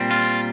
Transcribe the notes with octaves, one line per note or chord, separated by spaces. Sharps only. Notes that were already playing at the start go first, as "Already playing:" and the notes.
Already playing: A#2 G3 C4
F4